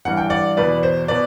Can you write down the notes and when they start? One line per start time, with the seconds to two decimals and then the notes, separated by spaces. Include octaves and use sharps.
0.05 G2 E3 F#5
0.17 G5
0.30 D5 F#5
0.57 E2 B2 B4 D5
0.83 C5
1.08 B2 B4 D5